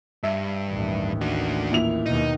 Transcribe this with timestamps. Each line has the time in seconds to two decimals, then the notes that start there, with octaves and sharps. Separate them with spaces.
0.23 G2 E5
0.68 A1 D#2
1.21 D4 F#4
1.72 A#2 E4 F7
2.06 D#2 B2 D#4